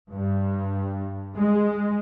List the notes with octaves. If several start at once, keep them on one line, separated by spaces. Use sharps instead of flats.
G2
G#3